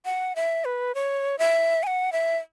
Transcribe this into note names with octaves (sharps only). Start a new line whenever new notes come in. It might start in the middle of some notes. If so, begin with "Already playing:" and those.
F#5
E5
B4
C#5
E5
G#5
F#5
E5